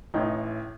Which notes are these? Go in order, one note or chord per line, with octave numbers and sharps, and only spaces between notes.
A1 A2 D#4